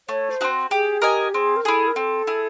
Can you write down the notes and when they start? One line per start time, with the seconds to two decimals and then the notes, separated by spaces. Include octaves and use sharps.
0.09 A3 C#5
0.30 C5
0.41 C4 D#4 F#4
0.71 G4 G#4
1.02 G4 A#4 D#5 G#5
1.34 C4 G#4
1.57 A#4
1.65 E4 G#4 A4
1.87 A#4
1.96 C4 A4
2.27 E4 G#4